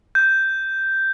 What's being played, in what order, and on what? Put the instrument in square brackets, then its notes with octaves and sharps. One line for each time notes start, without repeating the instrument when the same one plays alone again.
[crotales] G6